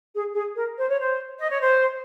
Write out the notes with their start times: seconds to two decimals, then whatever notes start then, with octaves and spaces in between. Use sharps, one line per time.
0.15 G#4
0.36 G#4
0.56 A#4
0.77 C5
0.89 C#5
0.99 C5
1.40 D#5
1.51 C#5
1.61 C5